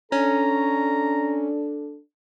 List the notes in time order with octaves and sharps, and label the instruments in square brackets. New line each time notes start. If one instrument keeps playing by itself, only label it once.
[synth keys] C#4 [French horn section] D4 A4 [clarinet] A#5